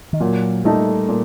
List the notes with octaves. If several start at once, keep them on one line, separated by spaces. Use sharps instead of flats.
D#3
A#2 F#3
G3 A3 D#4 A4
A#2